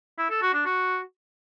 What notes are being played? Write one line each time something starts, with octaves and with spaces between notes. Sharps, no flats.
E4
A4
F#4
D4
F#4